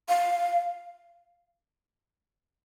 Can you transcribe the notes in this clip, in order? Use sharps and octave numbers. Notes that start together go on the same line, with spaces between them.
F5